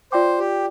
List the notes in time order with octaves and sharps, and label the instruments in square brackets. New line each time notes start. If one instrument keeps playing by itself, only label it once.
[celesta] F4 D5 G5 D6 [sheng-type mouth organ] C5
[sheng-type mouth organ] G4